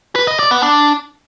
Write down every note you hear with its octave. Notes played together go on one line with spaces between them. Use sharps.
B4
D#5
D5
B3
D4